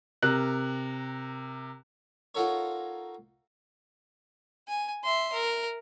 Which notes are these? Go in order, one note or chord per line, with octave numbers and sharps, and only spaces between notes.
C3 A#4 F#6
D#4 F4 F#4 A4 A#4 C#5
G#5
E5 C6
A#4